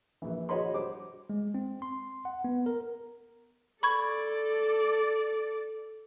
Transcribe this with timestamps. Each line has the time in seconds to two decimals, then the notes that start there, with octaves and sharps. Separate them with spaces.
0.22 A#1 E3
0.49 F#4 G#4 C#5 D#5 B5 C6
0.74 G3 C5 D6
1.30 G#3
1.54 C4
1.82 C6
2.25 F#5
2.44 B3
2.66 A#4
3.83 A4 D5 B5 C#6 G#6